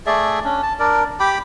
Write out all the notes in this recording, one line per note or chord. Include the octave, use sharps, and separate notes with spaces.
A3 G#4 D5 E5
C#4 D4
A5
D4 A#4 D5
G4 G5 B5 D6